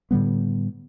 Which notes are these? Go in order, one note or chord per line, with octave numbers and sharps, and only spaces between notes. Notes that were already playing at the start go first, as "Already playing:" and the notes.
A2 D3 G3 B3